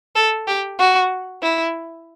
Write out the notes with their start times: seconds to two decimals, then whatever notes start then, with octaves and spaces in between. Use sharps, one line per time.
0.16 A4
0.48 G4
0.79 F#4
1.42 E4